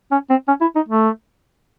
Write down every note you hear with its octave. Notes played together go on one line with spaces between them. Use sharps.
C#4
C4
C#4
E4
D#4
A3